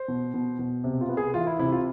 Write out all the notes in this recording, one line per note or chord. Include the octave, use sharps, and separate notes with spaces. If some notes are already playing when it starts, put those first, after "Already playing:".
Already playing: C5
B2
B2
B2
C3
F4
B3
G#4
E3 F4
E4
C3 E4
F4